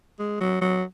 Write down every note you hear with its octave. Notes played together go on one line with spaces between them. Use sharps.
G#3
F#3
F#3